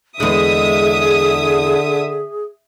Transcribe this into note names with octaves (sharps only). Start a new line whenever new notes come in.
E2 D3 G#3 G#4 E5 D#6